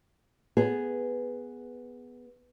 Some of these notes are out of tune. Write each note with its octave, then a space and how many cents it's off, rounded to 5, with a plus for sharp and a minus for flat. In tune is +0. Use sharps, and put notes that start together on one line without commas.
B3 +0 G#4 +0